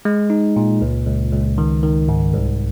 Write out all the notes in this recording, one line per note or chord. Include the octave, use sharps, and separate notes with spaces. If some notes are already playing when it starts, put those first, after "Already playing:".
G#3
D#4
A#2
C#2
C#2
C#2
D#3
D#3
G#2
C2